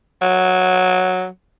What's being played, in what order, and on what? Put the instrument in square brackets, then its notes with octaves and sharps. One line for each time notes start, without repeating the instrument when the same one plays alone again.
[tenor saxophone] F#3